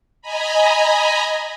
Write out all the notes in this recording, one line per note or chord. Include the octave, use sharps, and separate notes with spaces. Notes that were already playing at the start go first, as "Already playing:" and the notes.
D#5 G#5 A#5 B5